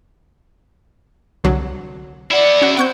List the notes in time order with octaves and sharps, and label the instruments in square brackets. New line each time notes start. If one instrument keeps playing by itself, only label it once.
[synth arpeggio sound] C2 D3 F#3
[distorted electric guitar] E4 F#5 [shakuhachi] D5
[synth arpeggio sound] C#4 F#4
[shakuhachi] C4 [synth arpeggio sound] F#5 C#6 G6